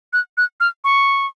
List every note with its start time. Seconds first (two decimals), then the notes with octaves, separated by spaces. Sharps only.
0.13 F#6
0.37 F#6
0.60 F6
0.84 C#6